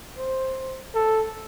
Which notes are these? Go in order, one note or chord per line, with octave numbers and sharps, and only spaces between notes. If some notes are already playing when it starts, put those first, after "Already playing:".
C5
A4